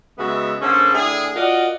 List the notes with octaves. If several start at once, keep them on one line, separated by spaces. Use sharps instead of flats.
C#3 G#3 B3 F#4 E5
D3 A#3 C#4 G#4 A4 C5
A2 D4 E4 G#4
F4 F#4 A#4 D5 D#5 F#5